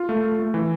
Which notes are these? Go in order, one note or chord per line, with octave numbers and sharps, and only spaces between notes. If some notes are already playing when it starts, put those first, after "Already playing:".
Already playing: F4
A3
A3
A3
E3